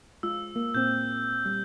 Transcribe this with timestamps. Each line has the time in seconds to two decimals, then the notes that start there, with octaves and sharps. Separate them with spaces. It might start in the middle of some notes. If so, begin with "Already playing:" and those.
0.23 G#3 F4 E6
0.56 A#3
0.74 A#2 C4 G6
1.45 G3